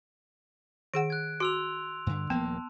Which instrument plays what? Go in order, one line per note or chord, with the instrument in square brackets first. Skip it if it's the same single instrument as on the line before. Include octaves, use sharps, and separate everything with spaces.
[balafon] D#3 G#4 F#5 [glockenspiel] D7
[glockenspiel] F#6 G#6
[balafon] F#4 [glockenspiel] C6 E6 F7
[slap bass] G2 D3
[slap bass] D#1 F3 A#3 [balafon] B3 [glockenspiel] A5